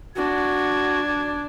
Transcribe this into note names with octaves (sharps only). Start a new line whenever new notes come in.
D4 F#4 G#6